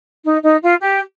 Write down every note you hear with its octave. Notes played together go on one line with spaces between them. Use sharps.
D#4
D#4
F4
G4